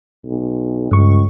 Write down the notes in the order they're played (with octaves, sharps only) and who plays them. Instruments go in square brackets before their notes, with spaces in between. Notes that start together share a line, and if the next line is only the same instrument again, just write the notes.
[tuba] B1
[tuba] C#2 [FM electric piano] G2 C#6